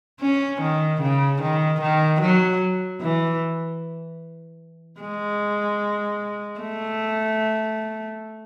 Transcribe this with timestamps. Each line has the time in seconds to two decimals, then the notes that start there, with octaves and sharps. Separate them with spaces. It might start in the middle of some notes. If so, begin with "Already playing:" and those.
0.21 C#4
0.61 D#3
1.01 C#3
1.41 D#3
1.81 D#3
2.21 F#3
3.01 E3
5.01 G#3
6.60 A3